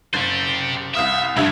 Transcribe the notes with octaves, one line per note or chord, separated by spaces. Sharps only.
F#1 G4 C5 A6
C2 E5 F5 D#6
C2 G2 F3 E5 G#6